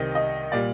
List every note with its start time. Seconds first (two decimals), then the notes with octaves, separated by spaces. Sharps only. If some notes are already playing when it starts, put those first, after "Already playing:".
Already playing: C2 C3 D#3 G3 D#5
0.15 D#5
0.52 A#2 G3 D5